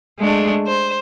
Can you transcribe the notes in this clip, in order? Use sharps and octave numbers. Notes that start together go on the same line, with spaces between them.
G#3 A3 D4
C5